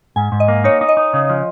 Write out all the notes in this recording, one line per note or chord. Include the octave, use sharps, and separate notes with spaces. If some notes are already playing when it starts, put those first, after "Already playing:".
G#2 G#5
G#2
D#5
A#3
D#4 C#5
D#4
D#5
D#4
C#3
F3